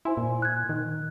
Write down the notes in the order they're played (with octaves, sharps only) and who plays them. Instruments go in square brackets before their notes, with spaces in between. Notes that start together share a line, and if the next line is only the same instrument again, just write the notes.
[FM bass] E4 [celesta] C5 G#5 C6
[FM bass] A#2
[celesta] F#6 G#6
[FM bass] D#3